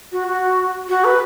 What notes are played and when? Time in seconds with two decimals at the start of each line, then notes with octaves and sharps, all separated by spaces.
0.12 F#4
0.27 F#4
0.89 F#4
1.04 B4